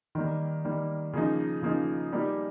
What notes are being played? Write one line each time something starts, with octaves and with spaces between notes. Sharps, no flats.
D#3 G3 A#3
D#3 G3 A#3
C#3 F3 A#3 D#4
C#3 F3 A#3 D#4
G3 A#3 D#4 G4